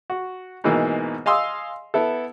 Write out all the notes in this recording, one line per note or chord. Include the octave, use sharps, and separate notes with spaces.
F#4
G#2 B2 E3 A#3
D#5 F5 G#5 C6 D#6 E6
B3 E4 A4